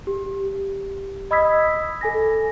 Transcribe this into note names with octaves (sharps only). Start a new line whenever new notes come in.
G4
D#5 B5 D#6 E6 G#6 B6
A4 G#5 A#6